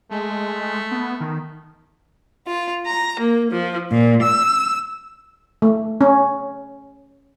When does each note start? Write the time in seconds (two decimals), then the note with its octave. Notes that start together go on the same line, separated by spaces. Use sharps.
0.11 G#3 A3
0.91 B3
1.20 D#3
2.47 F4
2.86 A#5
3.19 A#3
3.51 F3
3.90 A#2
4.22 E6
5.62 A3
6.01 C#4